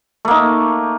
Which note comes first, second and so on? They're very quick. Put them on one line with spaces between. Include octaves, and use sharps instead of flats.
A3 A#3 D#4